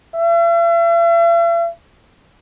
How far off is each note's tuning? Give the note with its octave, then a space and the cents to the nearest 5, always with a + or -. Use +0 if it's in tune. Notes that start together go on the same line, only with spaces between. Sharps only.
E5 +45